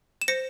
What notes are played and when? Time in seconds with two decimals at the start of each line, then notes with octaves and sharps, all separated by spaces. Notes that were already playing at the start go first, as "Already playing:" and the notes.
0.21 E7
0.28 C5 A#6 C#7